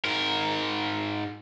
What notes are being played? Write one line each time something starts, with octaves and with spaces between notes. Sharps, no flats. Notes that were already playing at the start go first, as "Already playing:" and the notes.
G#2 A#4